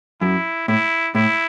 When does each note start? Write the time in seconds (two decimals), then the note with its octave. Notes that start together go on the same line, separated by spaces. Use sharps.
0.21 F#2 E4
0.68 A2 E4
1.15 A2 E4